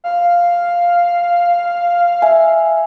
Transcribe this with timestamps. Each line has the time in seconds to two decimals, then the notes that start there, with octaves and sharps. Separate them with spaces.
0.04 F5
2.22 E5 G#5